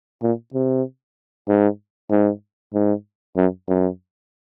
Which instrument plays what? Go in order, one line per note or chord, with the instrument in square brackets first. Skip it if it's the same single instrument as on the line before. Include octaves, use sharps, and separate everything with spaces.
[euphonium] A#2
C3
G#2
G#2
G#2
F#2
F#2